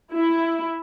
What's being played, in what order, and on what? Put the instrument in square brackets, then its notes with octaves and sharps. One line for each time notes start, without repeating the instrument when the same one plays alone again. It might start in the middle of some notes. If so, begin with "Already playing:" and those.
[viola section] E4